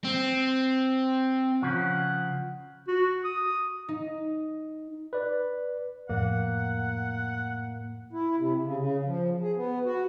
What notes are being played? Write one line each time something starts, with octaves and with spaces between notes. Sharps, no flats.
C4
C#3 F3 F#5
F#4
D#6
D#4
B4 D5
F2 A2 A#3 F#5
E4
C3
C#3
C#3
F3
G#4
B3
F#4